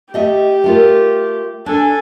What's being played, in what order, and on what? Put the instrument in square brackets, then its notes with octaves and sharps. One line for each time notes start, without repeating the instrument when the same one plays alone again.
[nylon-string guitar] A3 D#5 E5 [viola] G4
[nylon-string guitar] A3 F4 A#4
[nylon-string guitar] D4 [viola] A4 G#5